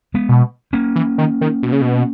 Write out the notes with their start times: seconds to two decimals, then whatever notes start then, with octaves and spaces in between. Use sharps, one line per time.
0.14 G#3 B3
0.29 B2
0.73 A#3 C#4
0.96 E3
1.18 D#3
1.41 D#3
1.63 B2
1.72 C#3
1.82 B2